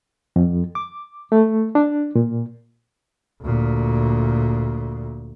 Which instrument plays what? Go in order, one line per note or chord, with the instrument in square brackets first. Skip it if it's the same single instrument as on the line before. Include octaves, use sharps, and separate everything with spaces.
[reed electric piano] F2
D6
A3
D4
A#2
[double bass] D2 A#2